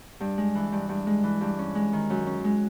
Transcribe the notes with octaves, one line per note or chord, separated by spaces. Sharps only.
G2
G#3
E3
G2
G2
G#3
E3
G2
C#4
G#3
D#3
F#2
C#4
G#3